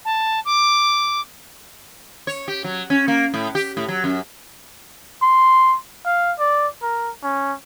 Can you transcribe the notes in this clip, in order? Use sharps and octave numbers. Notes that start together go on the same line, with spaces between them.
A5
D6
C#5
G4
F#3
C#4
A#3
A2
G4
A2
F#3
F#2
C6
F5
D5
A#4
C#4